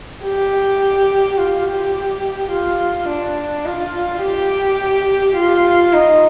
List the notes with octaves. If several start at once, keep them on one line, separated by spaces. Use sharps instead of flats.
G4
F4
G4
F4
D4
F4
G4
F4
D#4